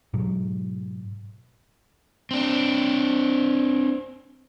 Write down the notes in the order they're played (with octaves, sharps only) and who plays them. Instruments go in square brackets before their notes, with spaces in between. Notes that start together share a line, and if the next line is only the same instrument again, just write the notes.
[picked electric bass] G#2 B2 F#3
[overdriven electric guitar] C4 D4